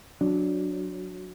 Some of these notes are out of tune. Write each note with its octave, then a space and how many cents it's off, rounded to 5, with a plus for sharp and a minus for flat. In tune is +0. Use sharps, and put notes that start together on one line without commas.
F#3 -10 D4 +0